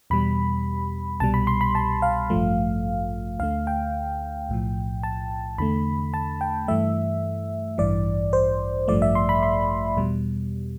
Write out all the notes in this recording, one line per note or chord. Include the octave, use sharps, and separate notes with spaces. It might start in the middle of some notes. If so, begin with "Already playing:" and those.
E2 B2 G3 B5
C2 B2 G3 A5
B5
C6
B5
A5
F5
A1 G2 F3 A3
D2 D3 A3 F5
G5
B1 A2 F3
A5
E2 D3 A3 B5
A5
G5
G2 E3 A3 E5
A1 G2 E3 D5
C5
A1 G2 F3 A3 D5
E5
C6
B5
C6
E2 B2 G3